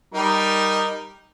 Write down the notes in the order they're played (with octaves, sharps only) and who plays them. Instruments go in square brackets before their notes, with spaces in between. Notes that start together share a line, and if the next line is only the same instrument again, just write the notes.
[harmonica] G3 D#4 A#4